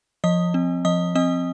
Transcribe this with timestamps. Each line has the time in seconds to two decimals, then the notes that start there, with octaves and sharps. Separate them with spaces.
0.24 F3 D#5 D#6
0.54 C4
0.85 F3 D#5 D#6
1.15 C4 D#5 D#6